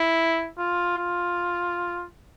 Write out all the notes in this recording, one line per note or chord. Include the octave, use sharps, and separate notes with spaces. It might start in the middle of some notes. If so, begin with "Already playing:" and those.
Already playing: E4
F4
F4